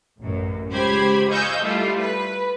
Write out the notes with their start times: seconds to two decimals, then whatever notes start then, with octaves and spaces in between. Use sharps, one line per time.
0.18 A1 F#2
0.71 C#2 G4 C5 B5 G#6
1.30 D#5 F5 G#5 C#6 E6 G6
1.63 G3 A3 E4 F4
2.00 B4